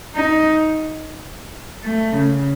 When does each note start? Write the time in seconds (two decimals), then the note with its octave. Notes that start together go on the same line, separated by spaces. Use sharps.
0.15 D#4
1.84 A3
2.13 C#3